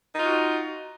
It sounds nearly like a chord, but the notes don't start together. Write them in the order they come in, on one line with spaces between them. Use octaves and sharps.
D#4 F4 F#4